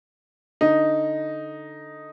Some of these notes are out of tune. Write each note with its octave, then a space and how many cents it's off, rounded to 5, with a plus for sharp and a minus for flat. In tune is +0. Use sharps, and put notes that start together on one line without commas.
D3 +0 D#4 +0